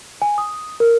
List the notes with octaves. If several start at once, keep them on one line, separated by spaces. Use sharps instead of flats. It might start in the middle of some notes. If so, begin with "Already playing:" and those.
G#5
D#6
A#4